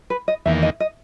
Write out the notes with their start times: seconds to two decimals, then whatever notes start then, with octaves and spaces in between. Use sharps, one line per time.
0.10 B4
0.28 D#5
0.46 E2 D#3 A#3 E5
0.63 D#5
0.80 D#5